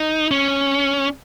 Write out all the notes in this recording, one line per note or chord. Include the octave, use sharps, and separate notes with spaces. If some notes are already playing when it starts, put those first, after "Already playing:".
Already playing: D#4
C#4